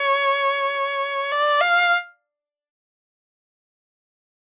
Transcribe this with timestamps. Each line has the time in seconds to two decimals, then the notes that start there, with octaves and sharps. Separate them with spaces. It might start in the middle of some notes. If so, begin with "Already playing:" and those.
Already playing: C#5
1.32 D5
1.61 F5